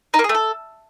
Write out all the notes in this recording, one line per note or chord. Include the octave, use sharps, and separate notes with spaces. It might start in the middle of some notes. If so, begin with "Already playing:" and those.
D#4
A#3
G#4
A3
A4